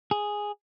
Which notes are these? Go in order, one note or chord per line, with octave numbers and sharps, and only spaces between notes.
G#4